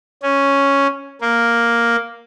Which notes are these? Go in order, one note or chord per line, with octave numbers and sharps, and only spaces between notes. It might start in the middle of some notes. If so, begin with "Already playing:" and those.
C#4
A#3